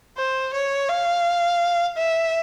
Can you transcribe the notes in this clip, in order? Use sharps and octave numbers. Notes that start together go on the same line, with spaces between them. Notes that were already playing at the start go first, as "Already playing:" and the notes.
C5
C#5
F5
E5